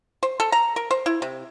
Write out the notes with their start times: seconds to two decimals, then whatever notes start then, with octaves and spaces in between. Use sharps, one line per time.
0.23 C5
0.40 A4
0.52 A#5
0.76 A#4
0.91 C5
1.06 E4
1.22 C3